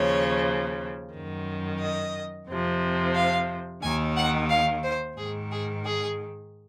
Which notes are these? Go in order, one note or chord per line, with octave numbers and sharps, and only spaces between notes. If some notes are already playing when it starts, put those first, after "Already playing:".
Already playing: D#2 C#3 F3 C#5
F#2 D#3
D#5
F2 C3 F3
F5
D#2 D#3 G#5
F#5
F5
C5
G#2 D#3 G#4
G#4
G#4